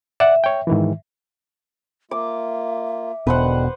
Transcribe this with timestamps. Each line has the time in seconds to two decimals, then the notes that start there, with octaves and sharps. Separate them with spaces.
0.20 D5 E5 F#5
0.44 C#5 G5
0.67 G#2 D#3 E3
2.11 A#3 F4 E5 D6
3.27 E1 B2 D3 D#3 B4 C5 F#5